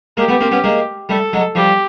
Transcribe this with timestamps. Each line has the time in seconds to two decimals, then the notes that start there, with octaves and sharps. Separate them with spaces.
0.17 G#3 A#3 G4
0.28 A3 B3
0.41 A#3 C4
0.52 B3 C#4
0.64 G#3 A#3
1.09 G3 A3 A4
1.33 F#3 G#3
1.55 F3 G3 G4